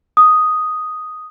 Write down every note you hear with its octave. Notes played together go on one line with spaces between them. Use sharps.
D#6